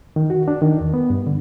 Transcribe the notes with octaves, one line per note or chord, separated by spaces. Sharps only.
D#3
F#4
D4
D#3
E2
B3
G2
D3